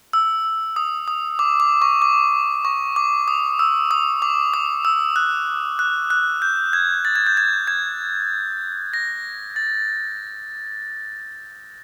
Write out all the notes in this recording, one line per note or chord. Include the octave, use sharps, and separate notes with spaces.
E6
D#6
D#6
D6
D6
C#6
D6
C#6
D6
D#6
E6
D#6
D6
D#6
E6
F#6
F#6
F#6
G6
G#6
A6
G#6
G6
G#6
G#6
A#6
A6